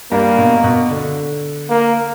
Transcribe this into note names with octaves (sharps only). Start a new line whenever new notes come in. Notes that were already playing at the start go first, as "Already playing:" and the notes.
G2 A#3
B2
B2
D3
A#3